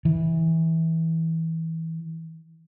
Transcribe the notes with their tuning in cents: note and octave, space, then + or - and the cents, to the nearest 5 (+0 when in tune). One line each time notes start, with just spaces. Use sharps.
E3 -20